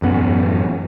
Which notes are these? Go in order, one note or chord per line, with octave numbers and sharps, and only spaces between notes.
A1 F#2 B3